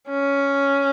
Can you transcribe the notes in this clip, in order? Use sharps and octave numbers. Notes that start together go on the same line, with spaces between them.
C#4